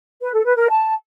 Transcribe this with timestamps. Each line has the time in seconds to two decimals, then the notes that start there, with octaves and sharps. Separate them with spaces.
0.21 B4
0.33 A4
0.45 B4
0.57 A#4
0.69 A5